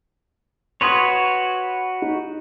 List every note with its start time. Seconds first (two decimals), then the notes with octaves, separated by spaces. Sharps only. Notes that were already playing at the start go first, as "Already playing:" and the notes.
0.81 F#4 B4 C#5 C6 D#6 G#6
2.02 D#4